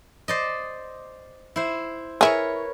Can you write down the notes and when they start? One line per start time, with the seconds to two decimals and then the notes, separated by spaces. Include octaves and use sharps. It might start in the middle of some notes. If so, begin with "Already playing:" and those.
0.28 C5 D5 D#5
1.56 E4 C5
2.21 E4 G#4 A#4 B4 C#5